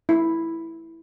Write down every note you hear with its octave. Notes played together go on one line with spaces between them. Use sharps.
E4